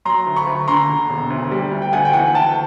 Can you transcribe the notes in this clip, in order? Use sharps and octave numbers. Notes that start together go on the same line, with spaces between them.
F#3 A#5 C6
D2
B5 C#6
D2
D3 A#5 C6
D3
E1
D2
G3
D2
G5
D2 F#5 G#5
G5
E3 F#5 G#5
D2 G5 A5